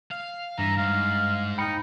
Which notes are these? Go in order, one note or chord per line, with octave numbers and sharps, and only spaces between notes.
F5
G2 E3 A#5
G#2 F5
D#4 G5 B5 C#7